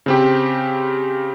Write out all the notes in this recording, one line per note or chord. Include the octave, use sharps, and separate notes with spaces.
C#3 C4 G4